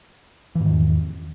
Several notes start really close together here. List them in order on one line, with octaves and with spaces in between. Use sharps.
E3 G#2 D#3 E2